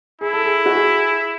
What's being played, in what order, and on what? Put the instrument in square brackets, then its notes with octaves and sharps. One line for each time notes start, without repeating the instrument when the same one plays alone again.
[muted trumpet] E4 [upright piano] G#4
[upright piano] A4
G#4
F#4
G#4